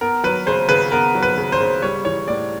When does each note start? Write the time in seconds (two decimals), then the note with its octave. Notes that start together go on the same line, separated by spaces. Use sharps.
0.01 B3 A#4
0.24 F#3 B4
0.46 C#3 C5
0.69 C#3 B4
0.92 B3 A#4
1.15 F#3
1.23 B4
1.37 C#3
1.52 C5
1.60 C#3
1.82 G3 C#5
2.05 E3 C#5
2.28 A2 D5